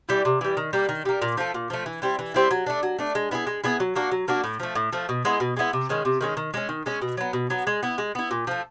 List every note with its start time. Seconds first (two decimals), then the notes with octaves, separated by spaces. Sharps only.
0.09 E3 G3
0.25 C3
0.41 E3 G3
0.57 D#3
0.73 G3 A#3
0.89 D#3
1.05 G3 A#3
1.22 A#2
1.37 F3 A3
1.54 A#2
1.70 F3 A3
1.86 E3
2.02 G3 C4 E4
2.19 E3
2.34 G3 C4 E4
2.51 F#3
2.66 A3 D4
2.83 F#3
2.99 A3 D4
3.15 G#3
3.31 B3 E4 G#4
3.47 G#3
3.64 B3 E4 G#4
3.80 F#3
3.96 A#3 D4 F#4
4.11 F#3
4.28 A#3 D4 F#4
4.44 A2
4.60 F3 A3
4.75 A2
4.93 F3 A3
5.09 B2
5.25 G#3 B3 E4
5.40 B2
5.57 G#3 B3 E4
5.73 C3
5.89 D#3 G#3 C#4
6.05 C3
6.21 D#3 G#3 C#4
6.37 D#3
6.54 G#3 C#4
6.69 D#3
6.86 G#3 C#4
7.02 B2
7.17 F#3 B3
7.33 B2
7.50 F#3 B3
7.67 G#3
7.83 B3 E4
7.98 G#3
8.15 B3 E4
8.31 A#2
8.47 F3 A3